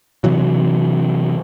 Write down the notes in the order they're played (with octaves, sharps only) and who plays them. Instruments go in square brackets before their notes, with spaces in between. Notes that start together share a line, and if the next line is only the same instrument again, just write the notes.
[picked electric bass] C3 E3 F#3